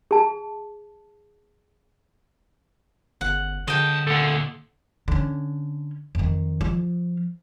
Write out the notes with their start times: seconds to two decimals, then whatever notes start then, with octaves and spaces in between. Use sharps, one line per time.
0.11 G#4 A5
3.21 G1 F#5
3.68 C#2 D3 D#5 G5 A5
4.07 D2 A#2 A4 F#5
5.08 D3 C#4
6.15 F2 D#3
6.61 F3 F4